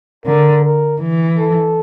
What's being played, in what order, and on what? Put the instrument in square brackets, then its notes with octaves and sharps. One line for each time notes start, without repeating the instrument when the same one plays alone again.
[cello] D3 [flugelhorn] A#4
[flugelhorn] A#4
[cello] E3
[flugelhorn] A4